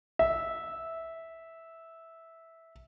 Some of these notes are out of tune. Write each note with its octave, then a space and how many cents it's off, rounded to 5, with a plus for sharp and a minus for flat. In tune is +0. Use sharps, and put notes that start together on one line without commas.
E5 -10